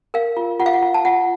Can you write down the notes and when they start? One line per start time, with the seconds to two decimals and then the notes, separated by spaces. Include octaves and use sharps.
0.14 A#4 F5
0.37 F4
0.59 F4 F#5
0.66 F5
0.73 F#5
0.82 F4
0.94 A5
1.05 F4 F#5